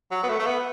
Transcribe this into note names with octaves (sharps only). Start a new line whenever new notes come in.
F#3
B3
A3
A3
B3